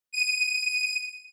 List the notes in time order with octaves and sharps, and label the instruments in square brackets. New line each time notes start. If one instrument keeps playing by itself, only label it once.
[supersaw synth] D#7